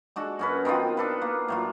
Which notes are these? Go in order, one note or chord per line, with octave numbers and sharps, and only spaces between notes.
G#3 D4 F#4 A4
F#2 C#4 B4
D#3 B3 C4 F4
D4 A4 B4
A#3
A2 F#3 F4